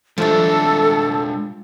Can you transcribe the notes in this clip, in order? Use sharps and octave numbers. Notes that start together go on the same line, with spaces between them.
F3 G3 G#3 D4 A4 E5